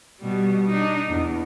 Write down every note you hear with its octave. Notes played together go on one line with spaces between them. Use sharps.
B2 G3
D4 D#4
E2